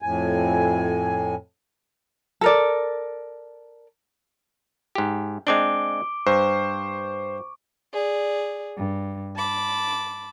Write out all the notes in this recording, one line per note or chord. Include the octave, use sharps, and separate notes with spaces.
F2 A2 G#5
A4 A#4 D5
G#2 G4
G#3 C4 D4 D6 D7 G7
G2 C5 C#6
G#4 D5
G2
A5 B5 D6